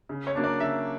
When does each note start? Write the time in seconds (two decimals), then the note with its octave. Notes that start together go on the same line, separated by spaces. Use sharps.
0.09 C#3
0.27 C#5
0.35 F#3 A#3 D4
0.44 D5
0.60 C#3 E5